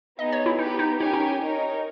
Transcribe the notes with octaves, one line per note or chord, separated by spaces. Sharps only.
B3 D#4 G#4 D#5
C#5
E4
B3 D#4 G4 B4
D#4
C#4 D#4 G4 A#4 C#5 G#5
D#4
D#4 A#4 C#5